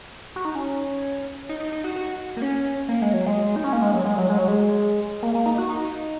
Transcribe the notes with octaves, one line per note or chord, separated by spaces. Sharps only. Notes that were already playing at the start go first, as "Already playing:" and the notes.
F#4
D#4
C#4
D#4
D#4
D#4
F#4
F#4
A#3
C#4
A#3
G#3
F#3
G#3
D#4
C#4
A#3
G#3
F#3
G#3
F#3
G#3
F#3
G#3
A#3
A#3
D#4
F#4
D#4